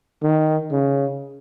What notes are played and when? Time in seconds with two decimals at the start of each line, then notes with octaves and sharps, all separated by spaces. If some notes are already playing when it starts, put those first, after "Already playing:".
0.23 D#3
0.71 C#3